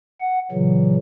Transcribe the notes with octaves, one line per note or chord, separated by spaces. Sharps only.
F#5
A#2 C#3 E3 F#3